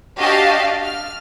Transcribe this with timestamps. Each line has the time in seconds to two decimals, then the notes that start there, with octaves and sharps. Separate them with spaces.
0.18 D4 F#4 G4 D#5 F5 A5
0.82 F6